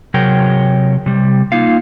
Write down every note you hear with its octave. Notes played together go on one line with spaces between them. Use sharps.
C3 F#3 G#4 A#4 C#5 G5
C3 G3
A#3 D#4 F4 F5